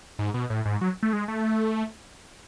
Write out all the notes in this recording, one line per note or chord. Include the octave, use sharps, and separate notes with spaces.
G#2
B2
A2
G#2
F#3
A3
G#3
A3